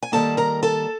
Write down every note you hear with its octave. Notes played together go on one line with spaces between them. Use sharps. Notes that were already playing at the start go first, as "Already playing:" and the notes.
G#5
D#3 G3 A#3 A4 A5
A#4 A#5
A4 A5